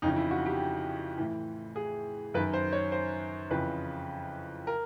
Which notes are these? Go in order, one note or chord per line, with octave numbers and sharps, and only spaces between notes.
F2 C#3 E3 D#4
E4
F#4
G4
A2 E3
G#4
F#2 D#3 B4
C5
C#5
C5
F2 C#3 E3 B4
A#4